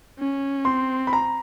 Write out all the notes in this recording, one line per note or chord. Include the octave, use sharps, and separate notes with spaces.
C#4
C4 C6
B5
A#5